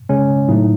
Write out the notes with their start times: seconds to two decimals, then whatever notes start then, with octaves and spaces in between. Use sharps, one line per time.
0.09 C#3 G#3 C#4
0.48 A2 F#3 A3 D#4